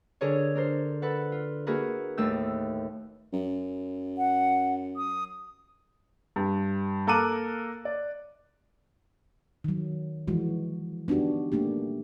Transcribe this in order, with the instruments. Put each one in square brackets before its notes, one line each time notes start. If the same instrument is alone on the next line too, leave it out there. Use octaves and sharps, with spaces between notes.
[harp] D3 G#4 A#4 C#5
D4 A#4 C5
A4 B4 F#5
F4
A#3 E4 F#4 G#4 A#4 B4
D#2 A2 A3 D#4 E6 G6
[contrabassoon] F#2
[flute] F#5
D#6
[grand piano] G2
A#3 A4 A#4 D6 F#6 D#7
D5
[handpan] D#3 F#3
E3 F3 G#3 F#4
B3 D4 D#4 F#4 G4
A3 A#3 D4 G4